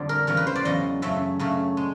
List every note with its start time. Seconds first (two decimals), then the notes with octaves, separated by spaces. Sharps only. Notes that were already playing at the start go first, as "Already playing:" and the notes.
Already playing: F2 D3 G3
0.09 A#4
0.27 E2 C#3 F#3 A#4
0.37 B4
0.47 C5
0.55 D5
0.65 E2 C#3 F#3 D#5
1.02 F#2 C#3 F#3 A3 E5
1.39 F#2 C#3 F#3 A3
1.77 G#3